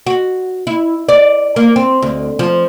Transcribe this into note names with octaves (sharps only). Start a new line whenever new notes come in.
F#4
E4
D5
A#3
C4
D2
F3